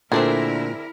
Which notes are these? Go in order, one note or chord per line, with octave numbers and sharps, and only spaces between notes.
A#2 D3 A3 C4 D4 E4 G#4 A#4